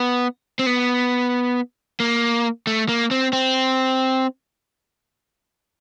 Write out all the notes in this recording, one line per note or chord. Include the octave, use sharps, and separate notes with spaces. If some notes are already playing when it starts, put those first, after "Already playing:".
Already playing: B3
C4
B3
A#3
A3
A#3
C4
C4